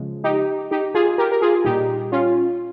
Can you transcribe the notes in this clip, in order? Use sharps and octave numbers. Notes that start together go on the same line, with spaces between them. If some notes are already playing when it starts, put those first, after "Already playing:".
Already playing: C#3 F3 G#3
D#4 G4
D#4 G4
F4 G#4
G4 A#4
A#4
F4 G#4
A#2 G3 D#4 G4
C#4 F4